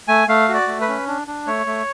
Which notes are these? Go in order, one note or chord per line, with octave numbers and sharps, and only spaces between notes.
A3 G#5
A3 F5
F#4
D5
A3
B4
C#4
D4
D4
A3 C#5
A3